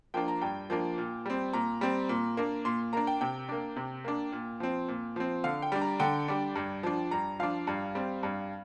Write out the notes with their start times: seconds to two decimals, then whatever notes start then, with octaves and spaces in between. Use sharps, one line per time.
0.14 F3 A#3 D4 G5
0.28 A#5
0.41 G2 G5
0.70 F3 A#3 D4
0.98 A#2
1.26 G3 C4
1.53 A#2 A#5
1.81 G3 C4
2.09 A#2
2.37 A#3 D4
2.65 A#2 C6
2.93 A#3 D4 A#5
3.07 G5
3.21 C3 G5
3.49 A#3 D4
3.76 C3
4.05 A#3 D4
4.32 A#2
4.60 F3 C4
4.88 A#2
5.16 F3 C4
5.44 D3 F5
5.62 G5
5.72 G3 D4
5.81 A#5
6.00 D3 G5
6.28 G3 D4
6.56 G2
6.83 F3 D4
7.11 G2 A#5
7.39 F3 D4 F5
7.67 G2
7.95 G3 C4
8.23 G2